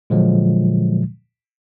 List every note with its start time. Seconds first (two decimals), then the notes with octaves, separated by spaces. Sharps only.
0.10 A#2 D3 F3 F#3 G#3